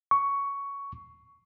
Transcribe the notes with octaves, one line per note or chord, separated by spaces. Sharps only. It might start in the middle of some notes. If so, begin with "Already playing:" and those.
C#6